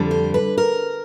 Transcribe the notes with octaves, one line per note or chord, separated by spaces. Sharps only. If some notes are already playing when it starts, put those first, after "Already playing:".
Already playing: F2 D3 G3
C5
B4
A#4